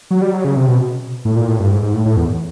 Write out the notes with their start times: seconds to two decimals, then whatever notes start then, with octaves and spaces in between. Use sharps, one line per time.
0.11 F#3
0.22 G3
0.34 F#3
0.45 C#3
0.56 C3
0.68 B2
1.25 A2
1.36 A#2
1.48 A2
1.60 G2
1.71 G#2
1.83 G#2
1.94 A2
2.05 A2
2.17 E2